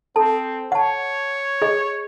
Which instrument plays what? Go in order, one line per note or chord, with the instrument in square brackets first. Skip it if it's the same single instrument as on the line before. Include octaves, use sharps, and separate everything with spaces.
[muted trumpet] C4 [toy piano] A4 A5
[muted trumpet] C#5 [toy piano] F#5 A5
[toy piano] G#4 D#5